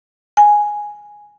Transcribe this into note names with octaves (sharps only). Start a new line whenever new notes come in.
G#5